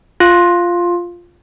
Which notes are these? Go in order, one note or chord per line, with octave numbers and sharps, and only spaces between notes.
F4